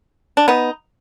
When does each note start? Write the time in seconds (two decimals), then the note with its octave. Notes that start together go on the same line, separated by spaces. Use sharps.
0.37 D4
0.48 B3 D#4